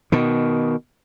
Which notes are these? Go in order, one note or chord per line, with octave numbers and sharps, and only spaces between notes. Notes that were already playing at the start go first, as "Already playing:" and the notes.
B2 D#3